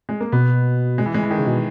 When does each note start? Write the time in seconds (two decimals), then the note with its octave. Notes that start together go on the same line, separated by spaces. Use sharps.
0.09 G#3
0.20 A#3
0.32 B2 B3
0.98 G#3
1.06 E3
1.14 G#3
1.23 E3
1.31 D#3
1.38 C#3
1.47 B2